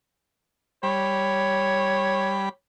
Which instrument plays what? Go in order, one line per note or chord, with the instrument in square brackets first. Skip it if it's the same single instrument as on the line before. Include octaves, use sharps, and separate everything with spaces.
[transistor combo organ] G3 B5 [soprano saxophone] C#5